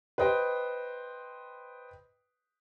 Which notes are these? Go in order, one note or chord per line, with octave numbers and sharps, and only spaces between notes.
B4 C5 D#5 G5